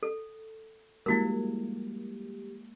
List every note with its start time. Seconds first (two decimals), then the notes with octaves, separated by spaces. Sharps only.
0.03 A4
1.06 F3 G3 G#3 A#3 E4 F#4 G4 A#4